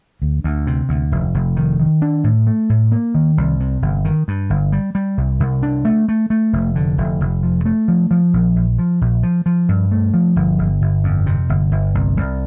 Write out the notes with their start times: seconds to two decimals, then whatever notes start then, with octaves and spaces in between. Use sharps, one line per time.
0.22 D2
0.44 D2
0.67 C3
0.89 D2
1.12 F1
1.34 F1
1.57 D#3
1.80 D#3
2.02 D4
2.24 A2
2.47 A3
2.69 A2
2.92 A#3
3.15 D#3
3.37 C2
3.60 C3
3.82 G1
4.05 D#3
4.28 G2
4.50 G1
4.72 G3
4.95 G3
5.17 C2
5.40 C2
5.63 D4
5.85 A3
6.08 A3
6.30 A3
6.53 F1
6.75 D3
6.98 F1
7.21 F1
7.43 F3
7.65 A3
7.88 F3
8.11 F3
8.33 A#1
8.56 A#1
8.79 F3
9.01 A#1
9.23 F3
9.46 F3
9.69 G2
9.91 A3
10.14 F3
10.36 G1
10.59 G1
10.82 G1
11.04 F2
11.26 C3
11.49 G1
11.72 G1
11.95 C2
12.17 C2